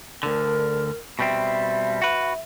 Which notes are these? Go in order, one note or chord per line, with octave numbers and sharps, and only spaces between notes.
D2 D3 A#4
B2 G3 C4 E5
F#4 B4